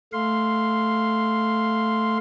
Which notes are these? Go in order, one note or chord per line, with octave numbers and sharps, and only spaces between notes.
A3 F5 C6